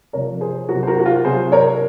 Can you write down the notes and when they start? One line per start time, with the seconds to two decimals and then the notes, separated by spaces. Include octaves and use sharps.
0.13 C3 F3 A#4 C#5
0.41 G#4 C5
0.69 C3 F#3 F#4 A#4
0.83 C5
0.87 F#4 A#4
1.00 F#4
1.06 F4
1.25 C3 F#3 G#4 C5
1.52 A#4 C#5